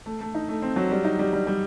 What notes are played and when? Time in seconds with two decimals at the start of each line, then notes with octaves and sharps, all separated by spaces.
0.06 A3
0.21 A3
0.35 D#4
0.49 A3
0.62 C4
0.76 F#3
0.91 G3
1.05 D#4
1.19 G3
1.33 G3
1.47 G3